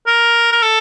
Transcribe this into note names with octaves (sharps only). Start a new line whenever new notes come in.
A#4
A#4
A4